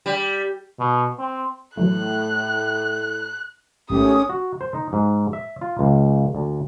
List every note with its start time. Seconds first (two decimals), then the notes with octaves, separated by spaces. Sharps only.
0.06 G3
0.79 B2
1.19 C4
1.77 A2 E3 F#3 A3 F#6
3.90 G#1 G#2 D#3 A3 C#4 G4 D#6
4.29 F#4
4.61 C5
4.74 D#4
4.93 G#2
5.33 E5
5.61 F4
5.79 C#2
6.35 D2